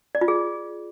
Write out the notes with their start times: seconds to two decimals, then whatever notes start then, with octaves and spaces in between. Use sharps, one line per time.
0.15 D5
0.21 F4
0.28 G#4